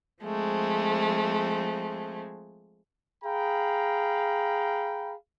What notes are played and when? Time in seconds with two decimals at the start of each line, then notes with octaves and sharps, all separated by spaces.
0.23 F3 G#3 A3 C4
3.24 G#4 F5 G5 A#5 B5